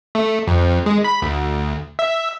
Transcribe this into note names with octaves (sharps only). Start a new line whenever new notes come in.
A3
F2
G#3
B5
D2
E5